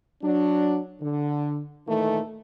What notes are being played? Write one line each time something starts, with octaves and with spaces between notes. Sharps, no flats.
F#3 D4
D3
A#2 D#3 E3 A3